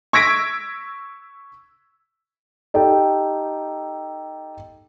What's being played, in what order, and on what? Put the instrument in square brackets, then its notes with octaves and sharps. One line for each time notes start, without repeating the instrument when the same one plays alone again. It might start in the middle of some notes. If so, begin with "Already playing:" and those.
[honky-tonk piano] C#6 E6 G#6 A#6 B6 D7
[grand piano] D#4 G4 A4 G5